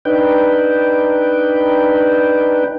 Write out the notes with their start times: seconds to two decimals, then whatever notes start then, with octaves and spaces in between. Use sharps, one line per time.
0.05 D4 D#4 B4 G5